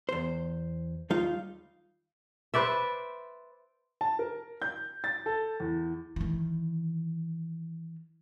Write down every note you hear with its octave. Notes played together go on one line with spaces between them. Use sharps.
E2 C5
D#2 G3 D#4 F4 F5
B4 C5 D5 E5
A5
A#4
G6
A6
A4
E2
D#3 E3